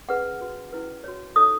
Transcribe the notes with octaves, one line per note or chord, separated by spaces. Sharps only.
C#4 G#4 B4 F#5
F#4 B4
C#4 E4 B4
F#4 C#5
D#4 A4 C#5 D#6